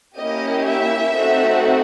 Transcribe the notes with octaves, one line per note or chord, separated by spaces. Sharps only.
A#3 C#4 E4 G4 D#5
E5
A3 C4 D#4 F#4 A4